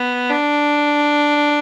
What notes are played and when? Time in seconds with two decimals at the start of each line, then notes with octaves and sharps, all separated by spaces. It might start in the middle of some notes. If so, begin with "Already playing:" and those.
Already playing: B3
0.30 D4